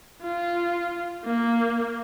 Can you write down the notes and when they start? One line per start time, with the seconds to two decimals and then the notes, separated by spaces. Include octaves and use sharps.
0.22 F4
1.25 A#3